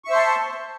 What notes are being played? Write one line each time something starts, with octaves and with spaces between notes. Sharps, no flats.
C5 E5 A5 C6 C#6